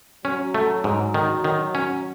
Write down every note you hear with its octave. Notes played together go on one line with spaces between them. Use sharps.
F#3 C#4
A3
G#2
D#3
D#3
C#4